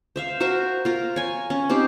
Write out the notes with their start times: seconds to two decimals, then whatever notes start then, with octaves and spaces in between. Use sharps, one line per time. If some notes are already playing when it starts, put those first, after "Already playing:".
0.16 C5 E5 F5
0.40 F#4 A#4 C5 E5
0.85 F4 A#4 A#5
1.16 C#5 G#5
1.50 C#4
1.69 C4 D#4 G4 C5